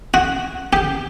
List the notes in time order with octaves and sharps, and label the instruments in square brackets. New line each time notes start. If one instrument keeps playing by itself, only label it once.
[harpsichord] F#4
G4